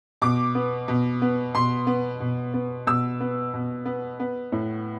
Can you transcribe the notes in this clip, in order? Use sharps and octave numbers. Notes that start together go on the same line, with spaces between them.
B2 D6
B3
B2
B3
B2 C6
B3
B2
B3
B2 E6
B3
B2
B3
B3
A2